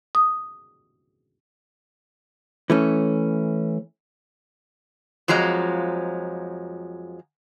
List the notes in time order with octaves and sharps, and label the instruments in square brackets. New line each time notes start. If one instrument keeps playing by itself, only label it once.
[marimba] D#6
[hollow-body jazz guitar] E3 A3 C#4
[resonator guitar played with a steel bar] F2 F3 F#3 G#3 A#5